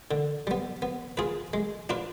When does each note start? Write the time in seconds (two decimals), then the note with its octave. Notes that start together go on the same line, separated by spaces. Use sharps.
0.11 D3
0.47 G3 B3
0.82 B3
1.17 F4 G#4 B4
1.53 G#3
1.89 D4 F4 B4